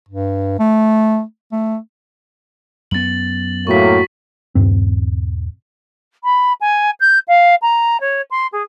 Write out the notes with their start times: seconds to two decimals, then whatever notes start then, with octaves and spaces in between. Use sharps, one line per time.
0.09 G2
0.59 A3
1.52 A3
2.91 F#2 B3 A6 F#7
3.67 A2 F#3 A#3 F#4 C#6 B6
4.55 D#1 G2 C4
6.24 B5
6.60 G#5
7.00 G6
7.27 F5
7.62 A#5
8.00 C#5
8.30 C6
8.52 G#4